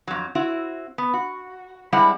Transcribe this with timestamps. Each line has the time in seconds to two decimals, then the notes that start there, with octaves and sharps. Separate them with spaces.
0.07 F2 F#3
0.35 C4 E4 F#4
0.98 B3
1.14 F#4
1.93 G3 G#3 C4 E4 F#5